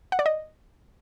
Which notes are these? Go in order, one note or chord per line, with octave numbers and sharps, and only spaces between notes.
F#5
D5
D#5